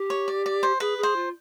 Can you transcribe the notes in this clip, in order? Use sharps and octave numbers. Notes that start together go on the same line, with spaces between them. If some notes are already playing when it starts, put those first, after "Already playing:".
Already playing: G4
C#5
D5
D5
C5
G#4 B4
G#4
C5
F4